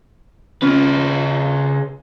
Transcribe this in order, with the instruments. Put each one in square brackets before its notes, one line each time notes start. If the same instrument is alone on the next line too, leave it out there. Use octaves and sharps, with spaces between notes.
[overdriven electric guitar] C#3 B4 [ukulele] C#4 F4